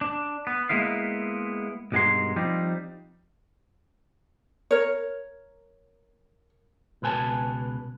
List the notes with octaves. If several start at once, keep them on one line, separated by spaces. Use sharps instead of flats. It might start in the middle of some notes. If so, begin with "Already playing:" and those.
D4
B3
G#3 A#3 B3 E4 F5
B1 G2 G#3 F#4 A#4 C6
F3 G3 C4 D#4
A#4 C#5
C#2 B2 B4 G#5 A5